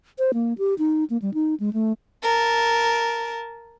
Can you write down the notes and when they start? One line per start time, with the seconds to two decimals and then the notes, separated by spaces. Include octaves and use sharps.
0.19 C5
0.34 A#3
0.58 G4
0.78 D#4
1.10 A#3
1.22 G3
1.34 D#4
1.60 G#3
1.73 A3
2.23 A#4 A5